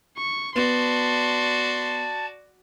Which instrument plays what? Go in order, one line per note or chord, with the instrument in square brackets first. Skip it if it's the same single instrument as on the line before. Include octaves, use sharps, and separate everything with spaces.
[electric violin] C#6
[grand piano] B3 [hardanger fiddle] F#4 D5 [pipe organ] A5 [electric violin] C6